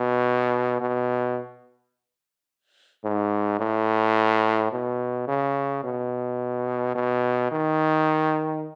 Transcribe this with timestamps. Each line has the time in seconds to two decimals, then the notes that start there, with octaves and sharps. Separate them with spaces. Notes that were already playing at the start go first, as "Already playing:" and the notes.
Already playing: B2
0.81 B2
3.04 G#2
3.60 A2
4.72 B2
5.28 C#3
5.84 B2
6.95 B2
7.52 D#3